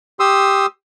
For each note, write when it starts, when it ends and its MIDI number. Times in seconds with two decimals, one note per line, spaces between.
0.20 0.66 67
0.20 0.66 84
0.20 0.66 87
0.20 0.66 88